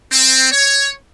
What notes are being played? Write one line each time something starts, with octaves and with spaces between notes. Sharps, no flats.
C4
C#5